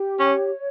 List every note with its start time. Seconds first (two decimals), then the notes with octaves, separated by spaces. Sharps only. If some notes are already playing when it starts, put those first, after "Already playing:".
Already playing: G4
0.19 C#4 C#5